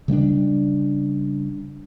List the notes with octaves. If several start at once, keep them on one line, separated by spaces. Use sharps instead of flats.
C#3 G3 A#3 D4